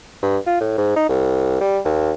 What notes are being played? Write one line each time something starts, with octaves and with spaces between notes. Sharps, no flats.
G2
F4
A2
G#2
D#4
C2
G3
D#2